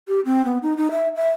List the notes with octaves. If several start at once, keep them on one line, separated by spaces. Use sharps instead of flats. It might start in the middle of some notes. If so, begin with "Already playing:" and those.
G4
C4
B3
D#4
D#4
E5
E5